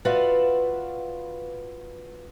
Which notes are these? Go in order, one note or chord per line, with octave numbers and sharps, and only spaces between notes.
F4 F#4 B4 D5 E5 F5